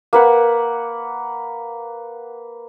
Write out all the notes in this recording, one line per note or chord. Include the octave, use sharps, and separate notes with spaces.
A#3 B4 F#5